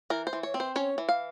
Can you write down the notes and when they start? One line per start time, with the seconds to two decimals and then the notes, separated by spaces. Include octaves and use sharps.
0.10 E3 A#4
0.27 C5
0.33 E3
0.43 C#5
0.54 C4
0.60 C5
0.76 C#4 C#5
0.98 E3
1.09 F5